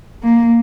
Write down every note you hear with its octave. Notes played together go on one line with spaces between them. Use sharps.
A#3